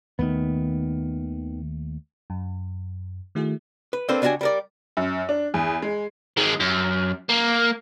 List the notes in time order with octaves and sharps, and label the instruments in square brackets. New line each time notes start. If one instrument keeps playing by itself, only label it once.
[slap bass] D#2 A3 [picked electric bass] D#3 B3
[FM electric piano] F#2
D#3 A3 E4 F#4 G#4
[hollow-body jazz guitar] B4
A#3 C4 D4 A4 B4 C5
C#2 D4 D#4 F#4 G4 G#5
G3 A#4 D5
[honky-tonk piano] F#2
D4
E2
G#3
[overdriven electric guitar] D#3 G#3
F#2
A#3